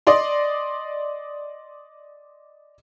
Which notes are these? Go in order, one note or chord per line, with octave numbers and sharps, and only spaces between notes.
D5 D#5 C6